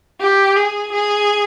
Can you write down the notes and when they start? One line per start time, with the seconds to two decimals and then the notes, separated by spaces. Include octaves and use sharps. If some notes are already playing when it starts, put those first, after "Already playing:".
0.21 G4
0.56 G#4
0.92 G#4